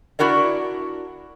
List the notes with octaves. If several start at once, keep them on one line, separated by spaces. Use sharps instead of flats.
D4 E4 F#4 A#4 D5